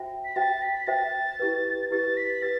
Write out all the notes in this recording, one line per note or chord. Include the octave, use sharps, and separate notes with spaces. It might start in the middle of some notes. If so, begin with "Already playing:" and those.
Already playing: F#4 C5 E5 G5
B6
F#4 C5 E5 G5 A6
B6
F#4 C5 E5 G5 A6
E4 G4 B4
E4 G4 B4 A6
B6
G4 B4 A6